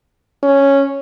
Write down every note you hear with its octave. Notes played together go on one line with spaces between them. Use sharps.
C#4